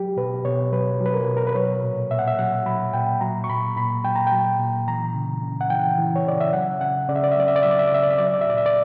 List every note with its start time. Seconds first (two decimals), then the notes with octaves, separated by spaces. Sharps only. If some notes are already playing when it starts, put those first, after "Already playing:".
Already playing: F#3 G4
0.17 B2 B4
0.45 B2 C#5
0.72 F#3 B4
1.01 F#3 B4
1.14 A#4
1.28 B2
1.37 A#4
1.47 B4
1.55 F#3 C#5
1.83 A#2
2.11 A#2 E5
2.19 F#5
2.28 E5
2.39 F#3 F#5
2.66 F#3 B5
2.93 A#2 G5
3.21 F#3 A#5
3.44 C#6
3.49 A#2 B5
3.76 A#2 B5
4.04 F#3 G5
4.15 A#5
4.27 G5
4.32 F#3
4.60 A#2
4.87 E3 A#5
5.15 C#3
5.43 C#3
5.61 F#5
5.70 E3 G5
5.98 E3
6.16 C#5
6.25 C#3 D5
6.40 E5
6.53 F#3 F#5
6.81 C#3 F#5
7.09 C#3 D5
7.16 E5
7.24 D5
7.31 E5
7.37 F#3 D5
7.48 E5
7.56 D5
7.63 F#3 E5
7.71 D5
7.79 E5
7.87 D5
7.91 C#3 E5
8.03 D5
8.10 E5
8.18 F#3 D5
8.26 E5
8.34 D5
8.41 E5
8.47 A#2 D5
8.57 E5
8.66 D5